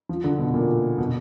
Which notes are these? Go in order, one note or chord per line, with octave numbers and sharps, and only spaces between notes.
F3
D3
B2
A#2
B2